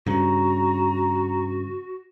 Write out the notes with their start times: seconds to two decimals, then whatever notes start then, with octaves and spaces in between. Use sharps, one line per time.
0.06 G2 C#3 F#4 A#5